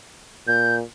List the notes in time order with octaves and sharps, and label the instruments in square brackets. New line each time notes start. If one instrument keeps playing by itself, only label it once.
[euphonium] A#2 [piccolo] G6